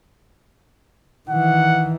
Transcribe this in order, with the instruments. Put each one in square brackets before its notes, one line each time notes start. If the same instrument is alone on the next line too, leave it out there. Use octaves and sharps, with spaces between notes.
[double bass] D#3 E3 [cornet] F#5